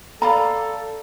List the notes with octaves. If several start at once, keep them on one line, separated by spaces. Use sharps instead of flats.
A4 D5 F5 A#5 B5